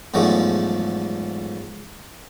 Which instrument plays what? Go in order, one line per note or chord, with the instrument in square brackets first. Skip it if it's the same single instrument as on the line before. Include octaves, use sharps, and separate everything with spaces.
[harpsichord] E2 G#2 F3 F#3 G#3 A3